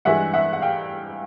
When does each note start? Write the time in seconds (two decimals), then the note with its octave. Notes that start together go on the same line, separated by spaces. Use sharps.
0.05 G2 E3 G#3 E5 F#5
0.34 E5 F#5
0.53 F#5
0.62 F5 G5